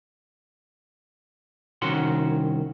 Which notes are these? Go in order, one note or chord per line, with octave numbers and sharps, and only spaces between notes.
C2 D#3 C#4 F#4 F#5 C6